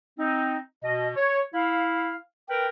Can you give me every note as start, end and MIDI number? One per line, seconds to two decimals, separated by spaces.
0.19 0.58 60
0.19 0.58 63
0.84 1.09 47
0.84 1.09 75
1.16 1.40 73
1.54 2.16 64
1.54 2.16 77
2.49 2.67 70
2.49 2.67 71
2.49 2.67 79